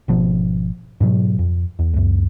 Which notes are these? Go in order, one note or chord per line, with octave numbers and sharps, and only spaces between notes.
G#1 B2 F3
G#2 B2 D#3 F#3
F2
E2
C#2 F#2